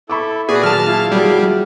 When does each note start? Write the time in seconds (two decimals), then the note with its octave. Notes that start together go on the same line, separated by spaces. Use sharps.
0.10 E4 A4 B5 C#6 D6
0.49 A#2 F#4 G#4 B4 D5
0.63 D#3 F#3 G#4 A5 F6
0.87 E4 F4 F5
1.12 F#3 G3 F#4 G#4